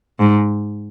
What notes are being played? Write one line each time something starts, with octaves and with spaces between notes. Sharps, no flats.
G#2